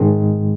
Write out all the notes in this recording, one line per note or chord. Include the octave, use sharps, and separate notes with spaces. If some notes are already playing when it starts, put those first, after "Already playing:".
Already playing: G#2 D#3 G#3